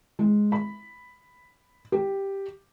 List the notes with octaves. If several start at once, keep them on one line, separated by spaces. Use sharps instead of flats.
G#3
B5
G4